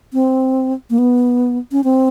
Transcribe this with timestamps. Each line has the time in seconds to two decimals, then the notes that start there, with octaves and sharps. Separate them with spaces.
0.13 C4
0.90 A#3
0.98 B3
1.72 C#4
1.84 C4